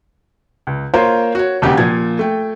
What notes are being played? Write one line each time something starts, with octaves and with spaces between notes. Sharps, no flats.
C#2
A#3 F4 A#4 C5 C#5
F#4 C#5
E1 D#2 C#3 G4 F#5
A#2 F3 G#6
A3 G5